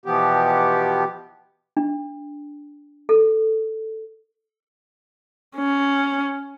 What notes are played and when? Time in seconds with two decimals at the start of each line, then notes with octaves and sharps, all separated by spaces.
0.06 B2 E3 F3 B3 G4
1.77 D4
3.09 A4
5.56 C#4